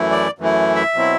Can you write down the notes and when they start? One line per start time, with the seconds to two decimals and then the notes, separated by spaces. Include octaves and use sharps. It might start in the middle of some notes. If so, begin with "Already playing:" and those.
Already playing: F#2 E3 A3 E4
0.11 D5
0.39 F#2 E3 A3 E4
0.75 E5
0.94 B2 F#3 C4 E4